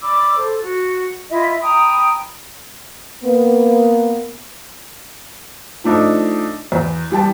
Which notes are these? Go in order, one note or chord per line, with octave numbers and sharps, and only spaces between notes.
D5 B5 D6 E6
A4 C5
F#4
E4 F4 D#5 E5
G5 A#5 B5 D#6
A#3 B3
F3 A3 D4 D#4
E2
E3 G3 G5 A5